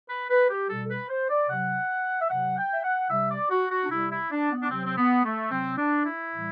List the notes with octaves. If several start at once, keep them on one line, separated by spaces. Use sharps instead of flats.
B4
B4
G4
B2 G3 A4
A4
B4
C5
D5
C3 F#3 F#5
E5
C3 F#3 F#5
G5
E5
F#5
C3 G3 E5
D5
F#4
F#4
D4
C3 G3 E4
E4
D4
B3
D4
C3 F#3 C4
C4
B3
A3
C3 F#3 C4
D4
E4
A2 E3 G3